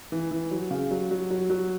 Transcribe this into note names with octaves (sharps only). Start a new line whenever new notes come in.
E3
E3
F#3
C#3
F#3
F#3
F#3
F#3